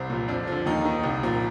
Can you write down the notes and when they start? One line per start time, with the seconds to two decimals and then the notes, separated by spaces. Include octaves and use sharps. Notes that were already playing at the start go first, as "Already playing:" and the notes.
Already playing: C2 C4
0.10 A#2 F3
0.28 F2 D4
0.47 D3 F3
0.66 D#2 D#4
0.85 D#3
1.03 C2
1.23 A#2 F3